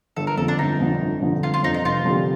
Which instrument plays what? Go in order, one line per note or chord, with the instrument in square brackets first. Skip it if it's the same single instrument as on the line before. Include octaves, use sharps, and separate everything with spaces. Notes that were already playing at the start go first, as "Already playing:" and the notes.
[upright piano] G1 [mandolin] A4
[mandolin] A#4
[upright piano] F2 [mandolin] A4
[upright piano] D3
[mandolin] D4
[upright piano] G1 [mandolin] D#4
[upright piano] F2 D3
G1
F2 D3
[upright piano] G1 [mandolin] F4
[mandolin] F4
[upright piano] F2 D3 [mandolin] D#4
[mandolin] D#4
[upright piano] F1 [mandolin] F4
[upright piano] F2 D3 G3 A#3